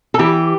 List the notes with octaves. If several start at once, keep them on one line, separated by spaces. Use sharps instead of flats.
A4
E3 G4